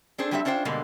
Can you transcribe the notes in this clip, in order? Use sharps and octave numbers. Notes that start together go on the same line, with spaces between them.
C4 D4 G#4 C5
F#3 G3 C4 G4 A#4 E5
C#4 D4 F4 C5 G5
G2 B2 D3 G#3 A#3